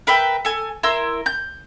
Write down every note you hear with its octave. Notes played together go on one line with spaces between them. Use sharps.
A#4 B4 E5 G5
A4 G#5
E4 A#4 C6 E6
G6